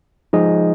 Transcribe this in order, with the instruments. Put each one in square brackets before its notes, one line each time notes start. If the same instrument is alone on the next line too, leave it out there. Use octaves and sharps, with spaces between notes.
[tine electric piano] F3 G#3 D#4 G#4 D#5